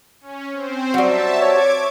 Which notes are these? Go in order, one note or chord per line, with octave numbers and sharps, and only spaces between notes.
C#4
C4 C5
F#3 G3 F#4 C5 E5 A5
C#5 D6 G#6